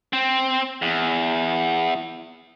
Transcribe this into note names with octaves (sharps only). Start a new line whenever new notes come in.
C4
E2